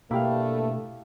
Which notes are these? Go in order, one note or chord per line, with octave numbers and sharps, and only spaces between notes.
G2 B2 A3 A#3 E4 G4 F5